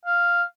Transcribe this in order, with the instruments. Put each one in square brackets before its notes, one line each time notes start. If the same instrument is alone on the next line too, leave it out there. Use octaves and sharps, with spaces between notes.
[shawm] F5